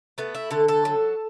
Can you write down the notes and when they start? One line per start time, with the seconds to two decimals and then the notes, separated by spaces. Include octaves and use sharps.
0.18 A3 B3
0.35 E4
0.51 D3 A4
0.68 A4
0.85 F#3